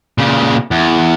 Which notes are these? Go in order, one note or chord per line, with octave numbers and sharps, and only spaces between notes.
A#2 C#3
E2